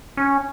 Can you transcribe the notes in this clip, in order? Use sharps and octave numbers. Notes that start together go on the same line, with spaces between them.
C#4